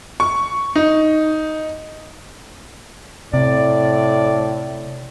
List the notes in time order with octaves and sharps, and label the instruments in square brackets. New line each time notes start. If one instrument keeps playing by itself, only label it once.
[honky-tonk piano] C#6
D#4
[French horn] A2 [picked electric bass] C3 [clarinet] D5